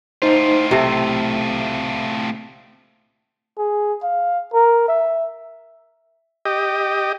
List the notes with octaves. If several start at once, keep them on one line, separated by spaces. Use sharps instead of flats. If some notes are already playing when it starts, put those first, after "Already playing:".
A2 D#4 F4 C5
B1 C3 A3
G#4
F5
A#4
E5
G4 D#5